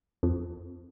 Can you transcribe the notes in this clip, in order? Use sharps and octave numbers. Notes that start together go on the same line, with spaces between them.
F2